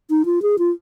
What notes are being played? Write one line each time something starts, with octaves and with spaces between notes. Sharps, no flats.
D#4
F4
G#4
F4